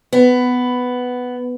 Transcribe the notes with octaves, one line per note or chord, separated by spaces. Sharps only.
B3